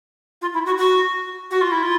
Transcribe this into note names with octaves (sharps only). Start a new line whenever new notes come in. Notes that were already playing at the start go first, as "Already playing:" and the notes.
F4
E4
F#4
F#4
F#4
F4
E4
F4